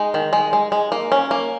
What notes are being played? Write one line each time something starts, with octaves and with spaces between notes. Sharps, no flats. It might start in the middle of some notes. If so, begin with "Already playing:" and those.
Already playing: G#3 D#4
D#3
G#3
G#3
G#3
A#3
C#4
A#3